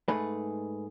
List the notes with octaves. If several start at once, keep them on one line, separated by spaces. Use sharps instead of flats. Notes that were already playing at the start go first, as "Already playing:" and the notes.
G#2 A3 G#4 B4